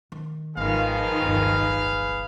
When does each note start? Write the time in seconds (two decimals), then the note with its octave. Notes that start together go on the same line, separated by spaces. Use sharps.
0.12 D#3
0.57 G#1 D#3 F3 G#4 B4 F5
1.22 D1 G1